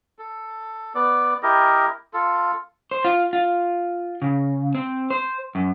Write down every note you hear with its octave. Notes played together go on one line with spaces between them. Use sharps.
A4
B3 D5
E4 G4 A#4 D#5
F4 A4
C5
F4
F4
C#3
C4
C5
F#2